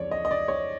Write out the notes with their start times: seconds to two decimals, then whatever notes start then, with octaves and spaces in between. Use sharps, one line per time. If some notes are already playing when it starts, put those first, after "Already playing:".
Already playing: F2 C#3 E3 G#3 C#5 D5
0.11 D#5
0.25 D#5
0.31 D5
0.48 C#5